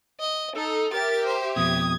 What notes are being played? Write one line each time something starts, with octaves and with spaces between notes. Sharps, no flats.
D#5
D#4 A4
G4 A#4 E5 A6
C5
F2 B2 D#6 G#6